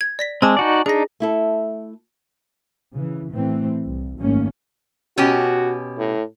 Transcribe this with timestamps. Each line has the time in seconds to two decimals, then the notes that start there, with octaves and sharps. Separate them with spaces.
0.01 G#6
0.19 D5 A#6 B6
0.42 G#3 C4 G#5 A5 D6
0.57 D#4 F#4 D5
0.86 D4 D#4 G#4 A#6
1.20 A3 E4 A4
2.93 C#3 E3
3.31 A2 E3 A3 C4
3.84 C2
4.18 G#1 F#2 D#3 A3 A#3 C#4
5.18 B2 C#4 F#4 G4
5.98 A2